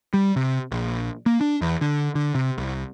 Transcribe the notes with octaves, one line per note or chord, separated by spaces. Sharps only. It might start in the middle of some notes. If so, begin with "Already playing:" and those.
G3
C3
A#1
A#3
D4
E2
D3
D3
C3
C2